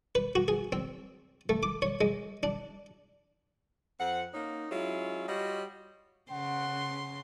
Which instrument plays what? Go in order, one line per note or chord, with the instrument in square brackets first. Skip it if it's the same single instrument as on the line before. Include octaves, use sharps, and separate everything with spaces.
[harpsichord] B4
F#4
G#4
C4
A3
D6
C#5
G#3
D4
[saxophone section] F2 C4 F#5
A#3 C#4 D#4
F#3 G#3 C#4 E4 F4
G3 F4 F#4 C#5 D#5
[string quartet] C#3 C6 [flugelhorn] F#5